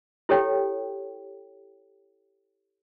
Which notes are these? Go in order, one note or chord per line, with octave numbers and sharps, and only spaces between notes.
E4 G4 A4 C#5 G5